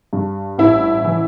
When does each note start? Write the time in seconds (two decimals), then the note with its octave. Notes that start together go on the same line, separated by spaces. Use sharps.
0.13 G2
0.58 A1 E4
1.05 E3